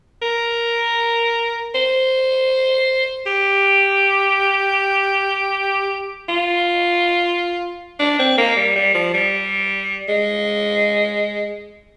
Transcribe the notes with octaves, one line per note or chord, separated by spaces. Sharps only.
A#4
C5
G4
F4
D4
C4
A#3
G3
G3
F3
G3
G#3